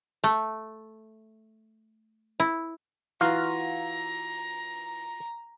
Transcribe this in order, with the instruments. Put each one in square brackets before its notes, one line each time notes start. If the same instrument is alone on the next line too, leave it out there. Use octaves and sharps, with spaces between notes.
[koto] A3
E4
[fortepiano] E3 [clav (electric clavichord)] F4 F#4 F5 [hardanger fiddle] A#5